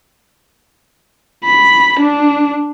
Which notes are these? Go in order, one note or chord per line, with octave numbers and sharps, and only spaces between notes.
B5
D4